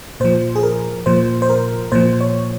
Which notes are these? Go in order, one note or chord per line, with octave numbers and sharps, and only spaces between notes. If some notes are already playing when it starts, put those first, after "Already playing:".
A#2 F3 C5
G#4
A#4
A#2 F3 C5
C5
A#4
A#2 F3 C5
C#5